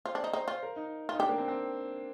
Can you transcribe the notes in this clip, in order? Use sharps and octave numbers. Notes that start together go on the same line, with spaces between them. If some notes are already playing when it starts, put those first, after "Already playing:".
F4 C5
D4
D#4 D5
D#4 C5
F4 C5
A#4
D#4
D#4 F4
D4 G4
A#3
C4
C4